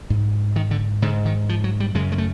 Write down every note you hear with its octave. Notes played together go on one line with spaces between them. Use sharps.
G#2
D#3
D3
G#2 D3
D#3
F3
F#3
G3
F#2 C#3 G#3
G#3
A3